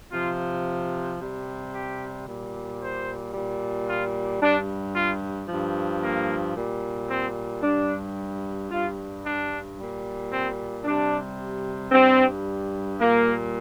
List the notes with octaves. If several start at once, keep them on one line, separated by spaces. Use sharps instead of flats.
C3 F3 F4
C3 G3
G4
A#2 G3
C5
A#2 G3
F4
G2 G3 D4
F4
G2 F3
A#3
A#2 G3
C4
G2 G3 D4
G2 G3 F4
D4
A#2 G3
C4
C3 G3 D4
G2 G3 C4
A#2 G3 A#3